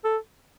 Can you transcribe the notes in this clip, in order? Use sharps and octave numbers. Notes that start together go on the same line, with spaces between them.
A4